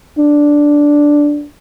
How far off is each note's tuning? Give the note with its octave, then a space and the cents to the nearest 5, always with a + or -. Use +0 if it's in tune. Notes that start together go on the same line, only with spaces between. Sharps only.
D4 -5